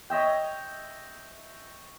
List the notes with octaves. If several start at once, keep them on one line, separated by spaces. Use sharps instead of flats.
C#5 D#5 E5 G5